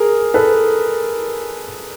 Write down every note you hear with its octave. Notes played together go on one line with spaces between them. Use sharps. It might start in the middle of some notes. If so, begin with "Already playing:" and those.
Already playing: G#4 A#4
A4 B4